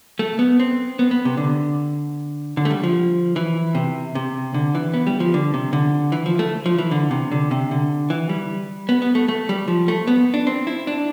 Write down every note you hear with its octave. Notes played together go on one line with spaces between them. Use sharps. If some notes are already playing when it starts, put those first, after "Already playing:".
A3
B3
C4
B3
B3
C3
D3
D3
A3
G3
F3
E3
C3
C3
D3
E3
B3
G3
F3
D3
C3
D3
E3
F3
A3
F3
E3
D3
C3
D3
C3
D3
E3
G3
B3
B3
A3
A3
G3
F3
A3
B3
D4
C4
E4
D4